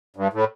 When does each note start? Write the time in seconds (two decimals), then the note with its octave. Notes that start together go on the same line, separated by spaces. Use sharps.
0.16 G2
0.33 A2